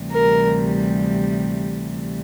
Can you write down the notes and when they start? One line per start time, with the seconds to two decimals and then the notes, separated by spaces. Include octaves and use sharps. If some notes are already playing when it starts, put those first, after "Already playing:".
Already playing: D2 C3 E3 G3
0.12 A#4